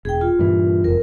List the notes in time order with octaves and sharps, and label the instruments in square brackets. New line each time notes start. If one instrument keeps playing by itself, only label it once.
[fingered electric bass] E1 [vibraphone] G#4 G5
[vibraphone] F4
[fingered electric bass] G2 A#2 E3
[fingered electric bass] F1 F2 [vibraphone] A#4